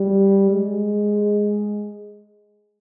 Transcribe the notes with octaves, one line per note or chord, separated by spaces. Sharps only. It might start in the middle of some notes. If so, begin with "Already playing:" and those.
Already playing: G3
G#3